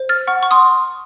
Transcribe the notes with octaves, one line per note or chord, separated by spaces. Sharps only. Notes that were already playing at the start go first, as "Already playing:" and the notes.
Already playing: C5
F6 A6
F#5 C#6 F6
C#6
C6 D#6